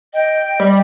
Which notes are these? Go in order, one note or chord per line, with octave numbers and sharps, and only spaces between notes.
D#5 G5
G3